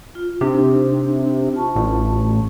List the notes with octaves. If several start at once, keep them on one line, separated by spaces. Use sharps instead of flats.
F4
C3 D4 D#4
F4 A5 C#6
A1